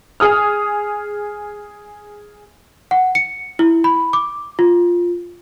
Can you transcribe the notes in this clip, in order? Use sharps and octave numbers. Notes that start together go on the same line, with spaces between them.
G#4 D#6 F6
F#5
C#7
E4
B5
D6
F4